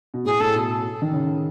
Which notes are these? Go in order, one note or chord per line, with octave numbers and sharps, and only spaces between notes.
B2
A2 G#4
A2 A4
B2
D#3
C#3